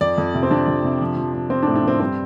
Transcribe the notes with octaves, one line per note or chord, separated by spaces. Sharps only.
F2 D5
F2
C3
C4
F2 D4
F2
C3
F3
F3
F3
F3 C4
D4
A2
D4
F3 C4
G2 C4